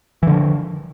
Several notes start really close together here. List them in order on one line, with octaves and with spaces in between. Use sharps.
E3 D3 F3